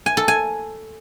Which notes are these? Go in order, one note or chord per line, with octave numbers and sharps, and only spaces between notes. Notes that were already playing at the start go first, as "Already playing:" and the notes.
G#5
A4
G#5